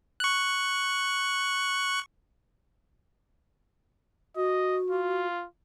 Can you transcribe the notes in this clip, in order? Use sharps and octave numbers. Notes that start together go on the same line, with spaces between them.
C#6 F#6
F#4 D#5
F4